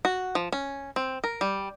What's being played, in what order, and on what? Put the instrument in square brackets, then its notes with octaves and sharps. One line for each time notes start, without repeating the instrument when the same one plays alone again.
[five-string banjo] F#4
F3
C#4
C4
A#4
G3